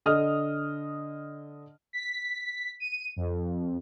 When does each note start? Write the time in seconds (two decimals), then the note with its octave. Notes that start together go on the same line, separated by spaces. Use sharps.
0.06 D3 D#5 D#6 F6
1.93 B6
2.80 D#7
3.16 F2